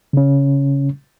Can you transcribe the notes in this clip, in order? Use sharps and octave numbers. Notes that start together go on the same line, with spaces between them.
C#3 C#4